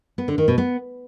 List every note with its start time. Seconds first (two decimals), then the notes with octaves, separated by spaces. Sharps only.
0.18 B3
0.28 D3
0.38 D#3
0.48 B2
0.58 B3